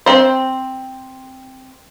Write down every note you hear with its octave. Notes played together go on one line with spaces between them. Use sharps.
C4 C5